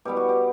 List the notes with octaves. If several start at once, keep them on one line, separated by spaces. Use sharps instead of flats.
B2 G3 B3 G4
F#4
G4